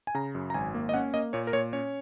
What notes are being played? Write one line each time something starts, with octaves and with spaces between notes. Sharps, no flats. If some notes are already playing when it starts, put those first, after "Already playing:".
G#5
C#3 A#5
F#2
A#5
G#1 G#5
A#3
D#5
C#4 F#5
A#3 D#5
A#2 C#5
A#4
A#2 C#5
C#4 C#5